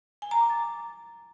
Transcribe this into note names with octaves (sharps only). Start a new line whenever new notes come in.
G#5
A#5
D6
A6